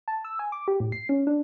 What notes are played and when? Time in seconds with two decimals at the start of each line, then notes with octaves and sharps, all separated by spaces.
0.08 A5
0.25 E6
0.39 G#5
0.52 D6
0.68 G4
0.80 A2
0.92 C7
1.09 C#4
1.27 D4